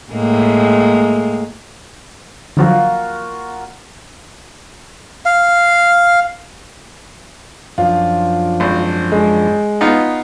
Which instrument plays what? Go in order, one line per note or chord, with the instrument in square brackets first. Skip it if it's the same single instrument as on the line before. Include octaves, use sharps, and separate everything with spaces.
[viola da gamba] A2 G#3 A#3
[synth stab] D3 F3 F#3 [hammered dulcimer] A#3 F4 F#4
[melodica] F5
[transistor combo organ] F#2 F3 D4 [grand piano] F4
[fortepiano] G#1
[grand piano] G#3
[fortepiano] B3 D#4 F4